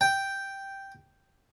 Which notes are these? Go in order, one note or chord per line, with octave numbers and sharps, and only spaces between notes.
G5